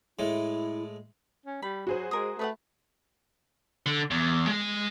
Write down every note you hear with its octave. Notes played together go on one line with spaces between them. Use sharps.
A2 G#3 E4
C#4
G3 B5
F#3 F#4 G#4 C5
G#3 A#4 D#6
A3 B4 D#5 F#5
D3
E2
G#3 G#5